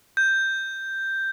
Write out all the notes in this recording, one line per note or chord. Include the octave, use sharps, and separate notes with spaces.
G6